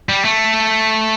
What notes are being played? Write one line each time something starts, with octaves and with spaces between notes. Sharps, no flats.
G3
A3